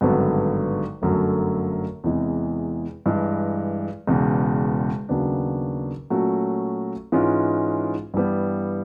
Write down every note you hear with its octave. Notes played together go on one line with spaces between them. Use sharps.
G#1 G2 D3 F#3 B3
G1 F#2 D3 F#3 A3
E2 C3 E3 G#3
G2 E3 G#3
E1 E2 C#3
D#2 C#3 F#3 B3 D4
A#2 F#3 A3 C#4 F#4
G#2 E3 G#3 C#4 F4
G2 E3 G3 B3